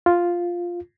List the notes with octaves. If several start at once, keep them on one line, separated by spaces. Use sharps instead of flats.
F4